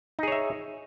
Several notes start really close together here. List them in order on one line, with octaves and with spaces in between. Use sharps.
D#4 G#4 C#5 E5